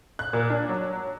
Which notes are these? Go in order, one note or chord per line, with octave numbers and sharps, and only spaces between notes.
F#6
A#2
D4
F#3